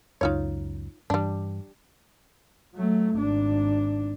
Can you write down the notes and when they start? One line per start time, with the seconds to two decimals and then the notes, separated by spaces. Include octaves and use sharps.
0.21 C#2 F#2 D#4 F4 C#5
1.10 G2 E3 G3 D4
2.75 F#3 A3
3.14 G#1 D4